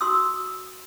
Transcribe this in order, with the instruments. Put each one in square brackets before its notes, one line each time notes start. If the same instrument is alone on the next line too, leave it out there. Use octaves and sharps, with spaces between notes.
[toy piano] F#4 C6 D#6 E6